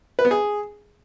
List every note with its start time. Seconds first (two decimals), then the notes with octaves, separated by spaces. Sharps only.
0.19 B4
0.25 B3
0.31 G#4